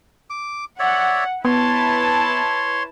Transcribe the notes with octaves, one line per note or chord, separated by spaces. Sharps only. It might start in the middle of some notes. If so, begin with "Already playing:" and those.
D6
C#5 D5 E5 F#5
B3 E4 B4 C#5 A5 C6